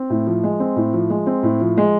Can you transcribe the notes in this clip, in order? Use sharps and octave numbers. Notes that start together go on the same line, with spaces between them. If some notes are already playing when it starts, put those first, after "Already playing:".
Already playing: C4
A2
F3
G#3
C4
A2
F3
G#3
C4
A2
F3
G#3